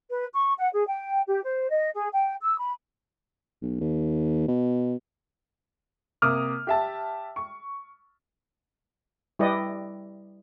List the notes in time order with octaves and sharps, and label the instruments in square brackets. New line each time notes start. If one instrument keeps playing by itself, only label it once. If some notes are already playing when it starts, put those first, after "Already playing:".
[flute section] B4
C#6
F#5
G#4
G5
G4
C5
D#5
G#4
G5
E6
B5
[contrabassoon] B1
D#2
B2
[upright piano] C3 A#3 D6 D#6 F6
G4 E5 A5
C#6
[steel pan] G3 E4 G4 B4 D5 D#5